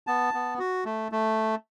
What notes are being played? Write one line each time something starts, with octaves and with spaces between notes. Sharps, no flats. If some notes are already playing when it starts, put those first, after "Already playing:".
B3 A5
B3
F#4
A3
A3